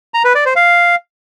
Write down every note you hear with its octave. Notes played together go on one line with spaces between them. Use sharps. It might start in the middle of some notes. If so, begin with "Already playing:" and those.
A#5
B4
D5
C5
F5